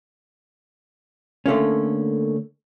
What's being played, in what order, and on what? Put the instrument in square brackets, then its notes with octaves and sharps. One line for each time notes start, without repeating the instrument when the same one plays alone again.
[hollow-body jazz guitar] D3 A3 A#3 C#4